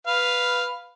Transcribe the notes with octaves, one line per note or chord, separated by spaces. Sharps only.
B4 F5